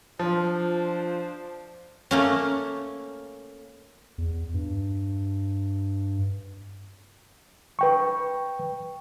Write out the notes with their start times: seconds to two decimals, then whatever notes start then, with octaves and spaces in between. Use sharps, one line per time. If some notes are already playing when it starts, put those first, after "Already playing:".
0.19 F3 D4 F4 C5
2.11 A3 A#3 C#4
4.18 E2
4.54 G2
7.79 B4 G5 C#6